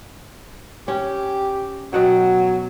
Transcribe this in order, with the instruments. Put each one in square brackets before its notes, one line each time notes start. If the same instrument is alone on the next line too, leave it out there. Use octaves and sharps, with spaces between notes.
[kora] C#4 [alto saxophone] G4
[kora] B2 F#5 G5 [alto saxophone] F#3